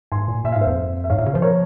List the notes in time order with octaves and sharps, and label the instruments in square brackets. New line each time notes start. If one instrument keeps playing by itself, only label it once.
[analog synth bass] G#2 [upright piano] G#5 C6
[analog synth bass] A#2
[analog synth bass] A#2 [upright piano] E5
[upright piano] F5
[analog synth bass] G#2
[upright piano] C5 E5
[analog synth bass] F2
[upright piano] E5
[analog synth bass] G#2 [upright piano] C#5 F5
[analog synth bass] A#2
C#3
[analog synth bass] F3 [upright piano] C5
[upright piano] A#4 C#5